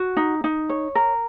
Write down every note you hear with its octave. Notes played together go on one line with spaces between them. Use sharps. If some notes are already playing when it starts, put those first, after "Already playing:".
Already playing: F#4
D#4
D#4
C#5
A#4